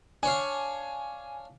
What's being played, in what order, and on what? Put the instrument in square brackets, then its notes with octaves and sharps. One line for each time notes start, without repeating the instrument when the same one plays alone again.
[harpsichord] D4 C#5 F5 [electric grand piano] G#5